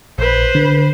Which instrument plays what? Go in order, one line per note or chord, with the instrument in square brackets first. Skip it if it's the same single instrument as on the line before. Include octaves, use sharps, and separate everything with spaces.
[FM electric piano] A#1 [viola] B4 C5
[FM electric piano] D3